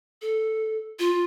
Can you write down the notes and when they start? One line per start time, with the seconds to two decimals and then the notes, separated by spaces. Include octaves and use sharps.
0.22 A4
0.99 F4